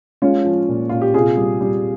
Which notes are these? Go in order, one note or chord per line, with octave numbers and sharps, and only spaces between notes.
G#3 C#4 F4
F3
A#2
A#2 F4
G4
C3 F4 G#4
G3
G3